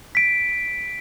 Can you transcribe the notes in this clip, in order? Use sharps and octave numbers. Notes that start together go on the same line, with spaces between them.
B6 D7